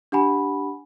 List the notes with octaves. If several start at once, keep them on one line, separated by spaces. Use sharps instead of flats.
D4 G4 F#5 G#5 B5